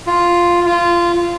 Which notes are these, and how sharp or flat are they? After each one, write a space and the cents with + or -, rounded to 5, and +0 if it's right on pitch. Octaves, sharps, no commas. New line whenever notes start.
F4 +0
F4 -15